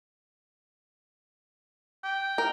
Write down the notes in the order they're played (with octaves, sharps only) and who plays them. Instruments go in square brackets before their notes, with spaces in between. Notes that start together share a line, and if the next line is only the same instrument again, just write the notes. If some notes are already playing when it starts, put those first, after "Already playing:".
[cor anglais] G5
[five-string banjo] A#4